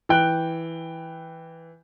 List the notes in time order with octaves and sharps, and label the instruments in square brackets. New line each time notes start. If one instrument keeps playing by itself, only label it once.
[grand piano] E3 G5 F#6